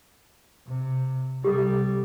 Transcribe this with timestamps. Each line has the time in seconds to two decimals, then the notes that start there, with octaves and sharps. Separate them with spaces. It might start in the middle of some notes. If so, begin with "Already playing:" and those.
0.67 C3
1.44 C3 G3 G4 A4